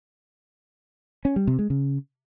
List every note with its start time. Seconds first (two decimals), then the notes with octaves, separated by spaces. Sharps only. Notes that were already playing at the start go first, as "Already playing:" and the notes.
1.25 C#4
1.36 G3
1.47 C3
1.59 G#3
1.70 C#3